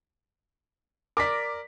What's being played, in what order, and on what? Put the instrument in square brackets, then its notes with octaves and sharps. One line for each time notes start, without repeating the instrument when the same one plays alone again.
[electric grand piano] A#4 D5 [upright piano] D6 A#6 B6